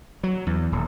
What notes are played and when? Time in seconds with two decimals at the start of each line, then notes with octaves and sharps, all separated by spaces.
0.23 F#3
0.47 E2
0.72 D#1